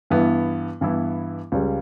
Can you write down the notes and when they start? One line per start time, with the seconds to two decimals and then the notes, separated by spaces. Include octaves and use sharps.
0.10 G2 E3 B3 E4
0.81 G2 E3 B3 E4
1.52 C#2 C#3 G3